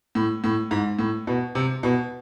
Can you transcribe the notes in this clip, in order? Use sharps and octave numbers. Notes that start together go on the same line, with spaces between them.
A2
A2
G#2
A2
B2
C3
B2